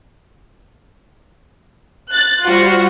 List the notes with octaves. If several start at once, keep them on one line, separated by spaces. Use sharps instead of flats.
F#6 A6
G3 F4 F#4 C5